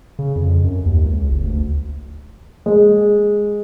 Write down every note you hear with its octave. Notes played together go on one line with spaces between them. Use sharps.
C#3
F2
F#2
D#2
C#2
F#1
D2
G#3